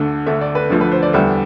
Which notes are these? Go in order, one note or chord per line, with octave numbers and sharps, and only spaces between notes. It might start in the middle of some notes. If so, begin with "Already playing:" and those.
Already playing: D2 D3 A3
D2 D3 A3 E5
D5
B4
D2 D3 F3 A3
B4
C5
D5
E2 D3 G3 E5